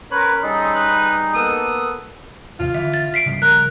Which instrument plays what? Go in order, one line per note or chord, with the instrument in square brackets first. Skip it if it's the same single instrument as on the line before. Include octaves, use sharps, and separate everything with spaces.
[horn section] C#4 B5 C6 [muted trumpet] A#4 [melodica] B4 C#5
[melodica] G3 G#4 [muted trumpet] D#4 [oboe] A4
[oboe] B4
[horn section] A#3 B3 A4 [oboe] D#6
[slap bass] D#2 C3 F3 [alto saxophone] F4
[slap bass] D3 E3 [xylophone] E5
[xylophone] A6
B6 C7 D7
[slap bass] C#3 F3 G3
[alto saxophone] A#4 [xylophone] F#6